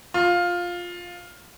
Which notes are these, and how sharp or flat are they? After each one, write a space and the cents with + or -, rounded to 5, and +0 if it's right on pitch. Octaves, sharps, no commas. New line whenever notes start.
F4 +10